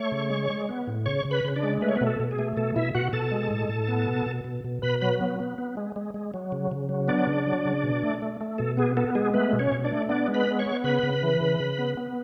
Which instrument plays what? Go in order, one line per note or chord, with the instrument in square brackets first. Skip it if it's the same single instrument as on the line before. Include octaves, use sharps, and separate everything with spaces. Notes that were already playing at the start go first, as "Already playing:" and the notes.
Already playing: [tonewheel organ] A3 C#5 C#6
C#3
G#3
G#3
B3
A2
C#3 C#5 C#6
C#3
B4 B5
C#3
D4 D5
G#3
A3 B4
C#5
B3 B4
B2
A4
B2
G#4
A3
B2 A4
B2 E4 E5
B2 F#4 F#5
B2 A4 A5
G#3
A2
A2
B3
B2
B2
B2
B2
B2 B4 B5
F#3 B4 B5
B3
B3
B3
G#3
G#3
G#3
F#3
C#3
C#3
F#3
B3 D4 D5
C#3
F#3
C#3
B2
A3
A3
A3
B2 A4
B3 G#4
B3 A4
G#3 G#4
A3 B3 B4
B2
C#4 C#5
B2
D4 D5
A3
B3 D4 D5
G#3
B4 B5
B3
C#5 C#6
B3
C#3 B4 B5
C#3
E3
C#3
C#3
B3
B3